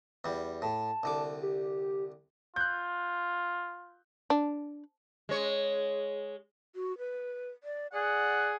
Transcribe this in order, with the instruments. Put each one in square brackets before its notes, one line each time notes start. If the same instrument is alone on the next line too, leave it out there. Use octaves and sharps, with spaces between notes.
[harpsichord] E2 G3
[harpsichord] A2 [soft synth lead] A5
[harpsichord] C2 D3 D6
[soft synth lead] G4
[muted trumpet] F4 [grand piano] F#6 G6
[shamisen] D4
[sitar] G#3 C#5
[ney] F#4
B4
D5
[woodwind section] G#4 F#5 [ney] D5